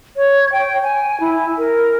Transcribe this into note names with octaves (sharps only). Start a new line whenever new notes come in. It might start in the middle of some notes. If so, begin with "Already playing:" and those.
C#5
G5
G#5
E4
A#4